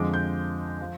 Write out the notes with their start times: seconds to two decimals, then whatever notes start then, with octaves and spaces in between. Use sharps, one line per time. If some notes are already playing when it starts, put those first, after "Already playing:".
Already playing: F2 D3 F3 G#3 D6
0.14 G6
0.81 F3